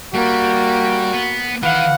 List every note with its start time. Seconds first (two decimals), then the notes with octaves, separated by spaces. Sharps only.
0.15 G3 A#3 F#4
1.14 B3
1.63 D#3 E3 F5 F#5